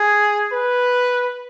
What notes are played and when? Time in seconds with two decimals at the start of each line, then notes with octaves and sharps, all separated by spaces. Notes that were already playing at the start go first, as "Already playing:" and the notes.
Already playing: G#4
0.52 B4